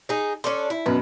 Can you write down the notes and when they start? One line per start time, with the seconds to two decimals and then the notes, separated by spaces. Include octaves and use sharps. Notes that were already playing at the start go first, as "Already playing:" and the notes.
0.09 D#4 G#4
0.44 C#4 D4 A4 C6
0.70 E4
0.86 F#2 B2 B4